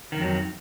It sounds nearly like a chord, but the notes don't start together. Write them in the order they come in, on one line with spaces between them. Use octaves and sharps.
D#3 F2 F#3